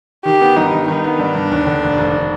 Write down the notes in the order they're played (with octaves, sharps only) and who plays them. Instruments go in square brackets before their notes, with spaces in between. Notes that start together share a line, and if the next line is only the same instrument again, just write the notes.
[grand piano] D#3 [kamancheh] G4
[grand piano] B3
[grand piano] G2 [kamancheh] D#4
[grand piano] G2
[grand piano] D#3 [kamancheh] D#4
[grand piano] B3
[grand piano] G2 [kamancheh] D4
[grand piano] G2
D#2
D3
F1
F1